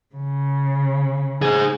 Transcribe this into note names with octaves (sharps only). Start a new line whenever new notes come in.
C#3
G#4 C5